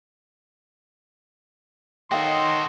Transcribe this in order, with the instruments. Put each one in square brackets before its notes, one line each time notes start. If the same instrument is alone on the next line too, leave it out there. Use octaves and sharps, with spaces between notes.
[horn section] D#3 D#5 [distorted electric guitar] F#4 A4 [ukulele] C#5 F5 G5 [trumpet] C6